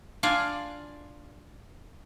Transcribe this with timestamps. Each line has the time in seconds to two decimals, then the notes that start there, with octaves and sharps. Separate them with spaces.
0.23 D4 F4 D5 F5 G#5